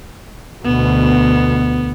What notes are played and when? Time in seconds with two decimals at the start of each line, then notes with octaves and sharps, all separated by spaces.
0.65 D2 B2 B3